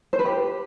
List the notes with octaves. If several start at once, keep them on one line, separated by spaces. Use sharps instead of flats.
C5
B4
G4